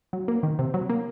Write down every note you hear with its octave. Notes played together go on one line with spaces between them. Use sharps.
F#3
A#3
D#3
C3
F#3
A#3